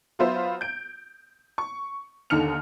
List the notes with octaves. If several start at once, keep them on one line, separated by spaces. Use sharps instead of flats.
F#3 B3 F4 C5 E5 F5
G6 D7
C#6
D#2 D3 D#4 F6 C#7 F7